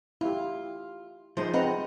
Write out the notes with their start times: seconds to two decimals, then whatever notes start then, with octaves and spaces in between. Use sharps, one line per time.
0.21 E4 F4 G4
1.37 F3 G#3 D#4 C5
1.54 C4 B4 D#5 F#5 A#5